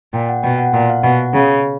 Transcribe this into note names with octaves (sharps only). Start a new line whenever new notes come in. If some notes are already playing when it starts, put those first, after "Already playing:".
A#2 G5
F#5
B2 G5
F#5
A#2 F#5
F5
B2 F#5
C#3